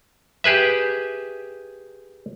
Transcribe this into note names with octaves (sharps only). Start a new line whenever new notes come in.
G4 G#4 B4 E5